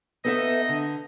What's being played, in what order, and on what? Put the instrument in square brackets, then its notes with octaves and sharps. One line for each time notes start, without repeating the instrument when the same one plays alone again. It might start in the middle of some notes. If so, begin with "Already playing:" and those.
[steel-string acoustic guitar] B3 A4 E5 [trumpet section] D#4 D#5
[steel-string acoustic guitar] D3